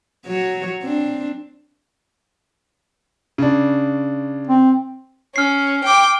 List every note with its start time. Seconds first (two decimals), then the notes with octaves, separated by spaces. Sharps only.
0.26 F#3 F#4 C#5
0.82 C4 D4
3.38 C#3 D4
4.47 C4
5.36 C#4 F6 C7
5.85 G5 D6